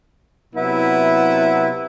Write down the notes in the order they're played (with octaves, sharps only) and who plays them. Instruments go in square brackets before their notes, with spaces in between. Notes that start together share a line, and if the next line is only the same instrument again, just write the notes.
[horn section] C3 F#3 B3 E4